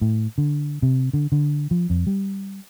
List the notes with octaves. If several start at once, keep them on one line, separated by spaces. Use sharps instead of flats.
A2
D3
C3
D3
D3
F3
F2
G3